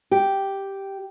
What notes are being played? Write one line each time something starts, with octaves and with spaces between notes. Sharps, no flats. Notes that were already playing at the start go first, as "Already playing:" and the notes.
G4